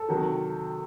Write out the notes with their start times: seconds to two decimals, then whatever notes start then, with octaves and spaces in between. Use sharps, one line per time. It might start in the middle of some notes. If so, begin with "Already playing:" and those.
Already playing: A4
0.09 C3 D#3 F#3